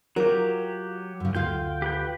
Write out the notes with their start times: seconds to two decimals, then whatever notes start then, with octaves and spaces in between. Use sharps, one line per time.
0.16 F#3 F4 G4 A#4
1.20 F#2 C#3
1.35 D2 F4 F5 G5
1.82 G4 B4 G5